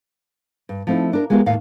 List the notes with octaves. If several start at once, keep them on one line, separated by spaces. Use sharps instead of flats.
G2
F3 A3 C4 D#4 E4
D4 A#4
G#3 B3 F4 G4 A#4
D#2 A2 D#3 F5